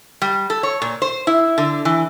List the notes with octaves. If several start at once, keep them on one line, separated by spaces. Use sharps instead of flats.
G3
A4
C#5
A#2
C5
E4
D3
E3